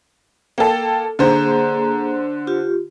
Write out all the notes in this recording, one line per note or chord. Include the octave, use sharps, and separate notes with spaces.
A#3 A4 G5
D3 A#3 G#4 C5 A#5
F4 G4